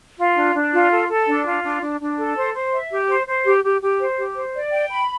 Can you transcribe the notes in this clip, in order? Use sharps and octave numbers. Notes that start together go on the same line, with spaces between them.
F4
D4
D4
F4
A4
A4
D4
F4
D4
D4
D4
A4
C5
C5
E5
G4
C5
C5
G4
G4
G4
C5
G4
C5
D5
G5
B5